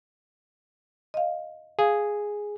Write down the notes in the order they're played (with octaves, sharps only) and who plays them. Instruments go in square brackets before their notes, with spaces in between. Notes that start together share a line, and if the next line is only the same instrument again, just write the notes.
[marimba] D#5 F5
[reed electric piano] G#4 [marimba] F5